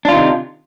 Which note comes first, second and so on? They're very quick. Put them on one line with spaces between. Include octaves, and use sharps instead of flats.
D4 F4 D#3 C3